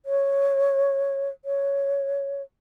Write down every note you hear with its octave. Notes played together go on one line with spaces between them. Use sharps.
C#5
C#5